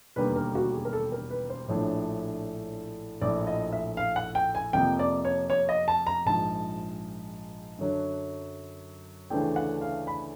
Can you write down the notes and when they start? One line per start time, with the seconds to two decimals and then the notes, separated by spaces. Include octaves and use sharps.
0.16 E1 D#2 D3 G3 A#3 B4
0.36 A#4
0.55 F#4
0.74 G#4
0.85 A#4
0.93 A4
1.12 A#4
1.31 B4
1.50 C5
1.68 A#1 A2 F3 A3 D4 C#5
3.21 A#1 A2 F3 D5
3.47 D#5
3.73 E5
3.97 F5
4.16 F#5
4.35 G5
4.55 G#5
4.73 F2 C3 F3 A#3 G5
4.99 D5
5.25 C#5
5.50 C#5
5.69 D#5
5.88 A5
6.07 A#5
6.26 A#1 G#2 F3 A5
7.78 F#2 D3 F#3
9.30 D2 C#3 E3 A3 D4 G5
9.56 F#5
9.81 F5
10.07 B5